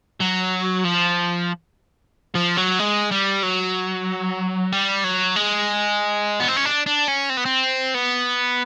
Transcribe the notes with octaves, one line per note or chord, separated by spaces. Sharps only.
F#3
F3
F3
F#3
G#3
G3
F#3
G3
F#3
G#3
B3
C4
C#4
D4
D4
C#4
C4
B3
C4
B3